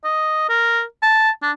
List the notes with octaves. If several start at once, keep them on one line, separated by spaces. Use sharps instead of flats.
D#5
A#4
A5
D4